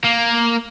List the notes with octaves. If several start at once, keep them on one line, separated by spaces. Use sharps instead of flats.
A#3